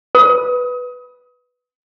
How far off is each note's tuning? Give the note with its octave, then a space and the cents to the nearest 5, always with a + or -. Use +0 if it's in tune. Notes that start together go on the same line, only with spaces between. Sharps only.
B4 +0 D#6 +30